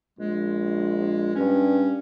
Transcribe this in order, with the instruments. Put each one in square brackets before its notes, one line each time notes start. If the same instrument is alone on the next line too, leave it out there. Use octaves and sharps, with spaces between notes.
[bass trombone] A#1 [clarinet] G#3
[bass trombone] G2 [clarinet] C#4